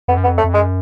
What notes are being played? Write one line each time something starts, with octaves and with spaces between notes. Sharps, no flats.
F2 B3
F#2
B3
F2
A3
F2
F#2 G#3